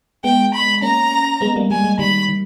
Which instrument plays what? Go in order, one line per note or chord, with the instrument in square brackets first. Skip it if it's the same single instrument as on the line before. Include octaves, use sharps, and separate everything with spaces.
[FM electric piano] G#3 B3 [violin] G5
[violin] B5
[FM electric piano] A#3 C#4 [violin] A#5
[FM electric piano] G#3 B3
G3 A#3
[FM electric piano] G3 [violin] G#5
[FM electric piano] G#3
[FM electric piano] D#3 G3 [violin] B5
[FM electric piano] D#3